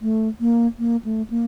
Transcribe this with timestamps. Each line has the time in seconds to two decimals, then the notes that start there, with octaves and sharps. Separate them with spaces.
0.02 A3
0.40 A#3
0.79 A#3
1.04 A3
1.30 A#3